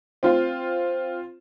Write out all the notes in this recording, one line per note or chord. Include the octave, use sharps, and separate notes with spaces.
C4 F4